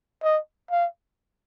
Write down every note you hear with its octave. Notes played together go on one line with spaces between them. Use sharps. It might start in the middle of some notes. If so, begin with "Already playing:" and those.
D#5
F5